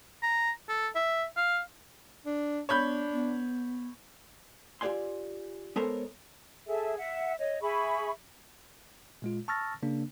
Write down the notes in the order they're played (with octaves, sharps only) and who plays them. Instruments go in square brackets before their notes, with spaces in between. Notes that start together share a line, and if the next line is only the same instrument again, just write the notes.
[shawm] A#5
A4
E5
F5
[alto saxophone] D4
[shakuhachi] B3 [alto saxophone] D4 [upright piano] C#5 B5 G6
[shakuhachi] B3
[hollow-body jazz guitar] F4 G4 C5 D5 G#5 C6
G#3 B3 A4 A#4 C5 C#5
[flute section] G#4 A4 E5
E5 F#5
C#5 D#5
G#4 E5 B5 C#6
[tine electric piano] A#2 G#3 F4
A5 C#6 E6 F6 A6 A#6
C#3 A#3 D4